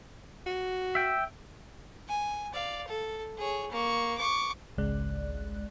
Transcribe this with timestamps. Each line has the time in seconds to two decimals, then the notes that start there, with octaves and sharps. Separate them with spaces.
0.46 F#4
0.95 E5 G5
2.08 G#5
2.53 D5 F5
2.87 A4
3.37 G#4 C#5
3.71 A#3 C#6
4.18 C#6 D6
4.78 G#1 C#2 C#3 G#3 D5 F#6